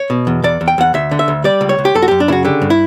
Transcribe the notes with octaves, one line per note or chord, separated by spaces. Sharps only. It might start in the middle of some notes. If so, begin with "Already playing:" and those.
Already playing: C#5
B2
E2
E2 D5
E2
G5
E2 F#5
D2 E5
D3
E5
D2
G3 D5
C#2
C#5
C#2
G4
F#2 A4
F#4
F#2 G4
D4
C#3 E4 F#4
D3 G4
G2
E4